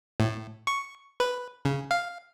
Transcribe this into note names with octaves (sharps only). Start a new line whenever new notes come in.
A2
C#6
B4
C#3
F5